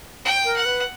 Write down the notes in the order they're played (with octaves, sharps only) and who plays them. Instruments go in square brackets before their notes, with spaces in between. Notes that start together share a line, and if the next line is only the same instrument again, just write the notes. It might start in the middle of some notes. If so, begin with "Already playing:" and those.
[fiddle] G5
[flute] A#4
[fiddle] F#5
[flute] B4